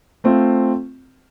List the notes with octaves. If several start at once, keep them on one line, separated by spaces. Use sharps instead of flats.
A3 C4 F4